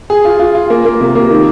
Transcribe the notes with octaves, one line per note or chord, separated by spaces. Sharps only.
G#4
F4
F4
F4
A#3
A#3
C3
A#3
D#3